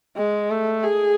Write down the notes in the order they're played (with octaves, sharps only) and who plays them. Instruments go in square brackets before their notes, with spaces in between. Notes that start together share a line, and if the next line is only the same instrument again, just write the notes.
[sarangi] G#3
A3
G#4